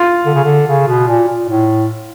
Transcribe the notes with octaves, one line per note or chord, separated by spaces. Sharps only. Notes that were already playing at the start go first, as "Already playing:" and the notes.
Already playing: F4
D3
C#3
D3
C#3
B2
A#2
A#2
A2